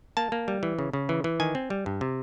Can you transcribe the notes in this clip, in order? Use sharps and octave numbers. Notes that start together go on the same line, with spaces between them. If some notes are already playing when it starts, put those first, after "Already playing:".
A#3 A5
A#3
G3
E3
C#3
C#3
E3
E3
D#3 G#5
C4
G3
G2
C3